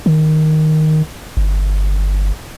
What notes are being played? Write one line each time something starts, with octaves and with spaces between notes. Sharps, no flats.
D#3
G1